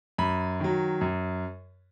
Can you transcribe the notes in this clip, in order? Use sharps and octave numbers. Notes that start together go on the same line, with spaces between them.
F#2 B5
D#3 F#3
F#2